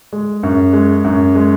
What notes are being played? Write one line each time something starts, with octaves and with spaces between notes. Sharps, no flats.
G#3
F#2
G#3
F#2
G#3